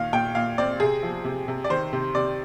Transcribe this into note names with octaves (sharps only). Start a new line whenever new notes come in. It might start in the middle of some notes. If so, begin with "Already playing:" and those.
Already playing: A#2 D#3 F5
A#2 G5
A#2 F5
C4 D5
C3 G#4
F3
C3
C3
D5
D#3 C5
C3
C3 D5